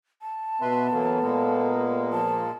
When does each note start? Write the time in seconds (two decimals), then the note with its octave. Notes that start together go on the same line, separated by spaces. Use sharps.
0.22 A5
0.61 B2 B3 B4 E5 C6
0.93 E3 F#3 A#3 A4
1.22 A#2 G#3 A#3
2.12 F3 A5